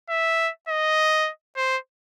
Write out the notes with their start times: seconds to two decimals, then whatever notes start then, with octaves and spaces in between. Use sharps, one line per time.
0.09 E5
0.69 D#5
1.56 C5